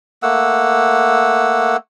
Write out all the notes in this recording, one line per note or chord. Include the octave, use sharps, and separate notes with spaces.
A3 A#3 F#5 E6